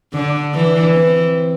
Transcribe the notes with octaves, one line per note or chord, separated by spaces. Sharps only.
D3 D4
E3
E3 C4